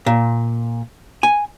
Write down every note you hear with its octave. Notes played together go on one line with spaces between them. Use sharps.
A#2
G#5